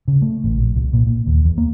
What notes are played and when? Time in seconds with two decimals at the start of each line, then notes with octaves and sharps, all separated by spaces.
0.08 C#3
0.22 A3
0.44 A1
0.57 A#1
0.76 C2
0.93 A#2
1.07 A#2
1.27 D#2
1.45 E2
1.58 A#3